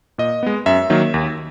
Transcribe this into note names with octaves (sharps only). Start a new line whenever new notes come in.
A#2 D#5
G#3 B3
F#2 E5
D#3 F#3 A#3
D#2